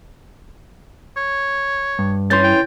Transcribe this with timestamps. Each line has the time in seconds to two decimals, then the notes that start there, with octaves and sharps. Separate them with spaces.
1.17 C#5
1.99 G2
2.30 E3 C#4 C6 G6 A6
2.43 G5